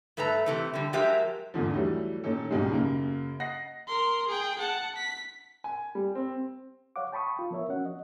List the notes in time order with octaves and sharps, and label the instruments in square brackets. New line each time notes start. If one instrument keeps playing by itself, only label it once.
[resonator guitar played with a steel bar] G2 A3 A4 B4 A#5
C3 E3 A3
D3 G3
F3 F#3 G#3 G4 A#4 E5
[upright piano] E2 G#2 D3 F3
E3 F#3 G3 A3
A#2 D#3 C#4 A4
C#2 G#2 B2 D#3 G3 G#3
F#2 C#3 A#3
D#5 F#5 A#6 C7
[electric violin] A#4 C6
G#4 G5
F#5 A5
B6
[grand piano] G#5
G3
C4
[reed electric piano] C#5 F5 F#5 D6
G5 A5 B5 C#6 D#6
F4
F3 B3 A#4 C#5 E5
F3 C#4 F#4 F#5
D#5